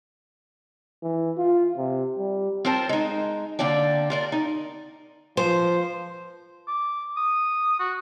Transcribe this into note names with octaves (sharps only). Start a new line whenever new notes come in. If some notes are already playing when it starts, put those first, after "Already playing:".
E3
F4
C3
G3
C4 F4 A#4 C5 A5
G#3 D#4
D3 A#3 D4 D5 G5
F4 A#4 D5
D#4
F3 C5
D6
D#6
F#4